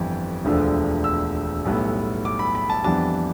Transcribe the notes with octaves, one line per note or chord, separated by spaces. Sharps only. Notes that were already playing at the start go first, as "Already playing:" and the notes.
Already playing: G1 F2 E3 G3
E1 D2 D3 F3
E6
B1 A2 G3 B3
D6
B5
B5
A5
F2 E3 G3 B3 D4 A5